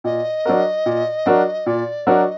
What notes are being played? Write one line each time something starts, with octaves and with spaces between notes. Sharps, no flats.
A#2 D#5
F#3 D4 F#4 A#4
A#2
F#3 D4 F#4 A#4
A#2 D5
F#3 D4 F#4 A#4 D#5